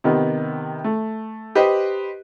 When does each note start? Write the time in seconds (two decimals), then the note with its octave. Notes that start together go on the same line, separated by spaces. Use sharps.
0.04 C3 D#3 B3
0.84 A3
1.55 G4 B4 C5 D#5